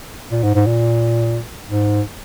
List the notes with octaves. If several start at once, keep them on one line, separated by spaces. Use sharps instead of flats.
A#2
G#2
G#2
A#2
G#2